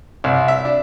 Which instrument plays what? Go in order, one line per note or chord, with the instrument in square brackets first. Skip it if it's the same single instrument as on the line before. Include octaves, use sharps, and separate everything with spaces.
[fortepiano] C2
E5
D4